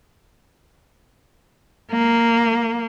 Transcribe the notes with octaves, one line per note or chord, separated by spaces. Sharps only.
A#3